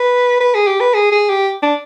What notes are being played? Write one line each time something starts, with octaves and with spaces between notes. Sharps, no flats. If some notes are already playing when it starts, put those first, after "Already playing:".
Already playing: B4
B4
G#4
G4
B4
G#4
G#4
G4
D4